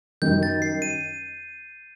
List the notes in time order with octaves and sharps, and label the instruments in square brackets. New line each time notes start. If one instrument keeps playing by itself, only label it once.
[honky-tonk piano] F#2 D#3 G3 [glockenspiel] G6
[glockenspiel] A6
C7
D#7